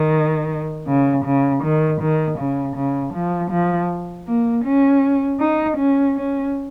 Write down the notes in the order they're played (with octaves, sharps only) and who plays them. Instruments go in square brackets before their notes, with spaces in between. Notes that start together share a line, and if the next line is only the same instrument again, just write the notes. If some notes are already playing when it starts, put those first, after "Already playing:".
Already playing: [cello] D#3
C#3
C#3
D#3
D#3
C#3
C#3
F3
F3
A#3
C#4
D#4
C#4
C#4